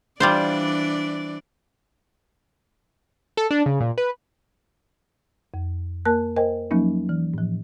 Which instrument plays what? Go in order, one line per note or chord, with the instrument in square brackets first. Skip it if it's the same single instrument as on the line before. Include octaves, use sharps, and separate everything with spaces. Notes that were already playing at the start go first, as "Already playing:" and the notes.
[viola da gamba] E3 D4 D5 [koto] G3 F4 C5
[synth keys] A4
D4
C#3
A#2
B4
[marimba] F2
A#3 A#4 A5 F#6
A#4 C5 D#5 G5 G#5
F3 F#3 A#3 C#4 D#4
E3
A2 F3